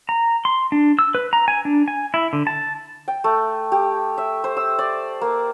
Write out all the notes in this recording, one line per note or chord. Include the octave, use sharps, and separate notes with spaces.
A#5
C6
D4
E6
B4
A#5
G#5
D4
G#5
E4
D3
A5
G5
A3
G4
E5
C5
E6
D5
A#3